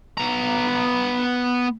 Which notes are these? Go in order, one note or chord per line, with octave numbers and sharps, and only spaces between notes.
B3 A#5